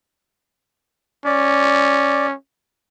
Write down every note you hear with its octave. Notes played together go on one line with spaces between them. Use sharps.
C#4 D5